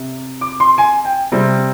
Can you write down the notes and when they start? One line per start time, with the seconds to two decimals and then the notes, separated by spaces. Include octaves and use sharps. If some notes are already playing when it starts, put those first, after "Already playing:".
Already playing: C3
0.41 D6
0.60 C6
0.78 G#5
1.05 G5
1.32 C3 G3 C4